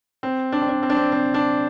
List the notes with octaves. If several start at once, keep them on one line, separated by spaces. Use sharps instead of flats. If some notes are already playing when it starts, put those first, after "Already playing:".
C4
D4
C4
D4
C4
D4
C4
C4
D4